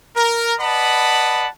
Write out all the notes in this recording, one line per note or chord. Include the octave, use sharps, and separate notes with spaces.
A#4
B4 D5 D#5 F#5 A5 B5